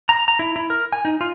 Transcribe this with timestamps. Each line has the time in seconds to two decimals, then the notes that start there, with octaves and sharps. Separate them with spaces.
0.09 A#5
0.28 A#5
0.39 E4
0.56 E4
0.70 A#4
0.92 G#5
1.05 D#4
1.21 F4